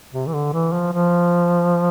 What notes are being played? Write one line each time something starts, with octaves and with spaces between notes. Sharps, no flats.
C3
E3
D3
E3
F3
F3